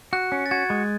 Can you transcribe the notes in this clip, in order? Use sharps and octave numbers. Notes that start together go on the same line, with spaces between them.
F#4 F#6
C#4
A6
F#4 G#6
G#3